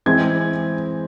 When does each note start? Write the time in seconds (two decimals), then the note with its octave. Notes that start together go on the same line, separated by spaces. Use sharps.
0.06 E3 G#3 C4 E4 G#6